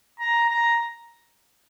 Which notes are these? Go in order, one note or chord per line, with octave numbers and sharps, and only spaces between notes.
A#5
A#5